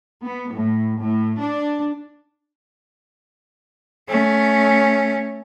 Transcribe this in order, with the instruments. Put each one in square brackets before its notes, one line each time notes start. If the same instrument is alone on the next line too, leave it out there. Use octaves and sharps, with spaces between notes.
[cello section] B3
A2
A2
D4
[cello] A3 C#4